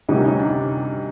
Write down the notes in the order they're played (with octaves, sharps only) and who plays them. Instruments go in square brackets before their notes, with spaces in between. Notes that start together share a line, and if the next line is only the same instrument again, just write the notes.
[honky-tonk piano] D2 C3 D#3 G3 [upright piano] C#4 D#4
[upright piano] C#4 D#4
D4